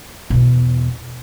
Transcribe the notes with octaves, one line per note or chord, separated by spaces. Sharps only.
E2 B2